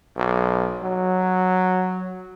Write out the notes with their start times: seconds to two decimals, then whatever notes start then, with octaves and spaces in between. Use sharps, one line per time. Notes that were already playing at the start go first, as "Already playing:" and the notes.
0.17 B1
0.83 F#3